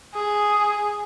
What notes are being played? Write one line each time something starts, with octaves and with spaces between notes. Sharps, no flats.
G#4